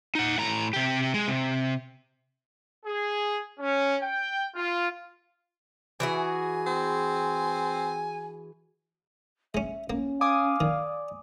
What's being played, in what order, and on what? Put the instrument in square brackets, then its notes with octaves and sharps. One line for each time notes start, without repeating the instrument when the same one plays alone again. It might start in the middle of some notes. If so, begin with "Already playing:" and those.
[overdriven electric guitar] D#4 F#5
A2 A#5
C3 G4
G#3
C3
[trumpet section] G#4
C#4
G5
F4
[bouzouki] E3 F#4 G#4 [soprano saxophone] G#5
[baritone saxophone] C4
[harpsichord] G#3 C#4 [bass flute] E5
[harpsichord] A#3 [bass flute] C#4
[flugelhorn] F5 [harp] G#5 D6 D#6
[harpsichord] D#3 [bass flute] D5